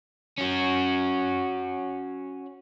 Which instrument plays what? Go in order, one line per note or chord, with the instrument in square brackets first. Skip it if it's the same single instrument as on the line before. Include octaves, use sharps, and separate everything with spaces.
[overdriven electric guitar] C#4 F#4